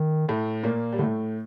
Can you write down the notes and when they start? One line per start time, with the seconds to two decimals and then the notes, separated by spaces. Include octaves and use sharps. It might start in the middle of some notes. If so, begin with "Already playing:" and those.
Already playing: D#3
0.28 A2 A3
0.63 A#2 A#3
0.93 G3
0.98 A2 D3 A3